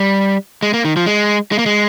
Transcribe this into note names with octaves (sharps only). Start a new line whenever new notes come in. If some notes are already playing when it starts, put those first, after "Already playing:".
Already playing: G3
G#3
A#3
D#3
F3
G#3
G#3
A#3
G#3